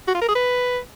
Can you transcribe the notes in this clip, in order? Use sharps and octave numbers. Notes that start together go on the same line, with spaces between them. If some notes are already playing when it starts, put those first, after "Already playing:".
F#4
F4
A#4
G#4
B4